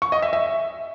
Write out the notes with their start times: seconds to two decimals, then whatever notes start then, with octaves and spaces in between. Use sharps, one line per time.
0.02 C#6
0.12 D#5
0.22 E5
0.33 E5